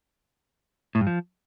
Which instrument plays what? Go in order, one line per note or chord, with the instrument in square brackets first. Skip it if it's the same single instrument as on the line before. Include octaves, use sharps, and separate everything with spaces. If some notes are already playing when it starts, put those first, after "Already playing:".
[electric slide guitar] A2
G2
F3